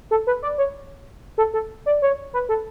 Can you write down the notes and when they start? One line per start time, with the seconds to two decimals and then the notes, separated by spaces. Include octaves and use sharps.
0.11 A4
0.27 B4
0.43 D5
0.58 C#5
1.38 A4
1.54 A4
1.86 D5
2.02 C#5
2.33 B4
2.49 A4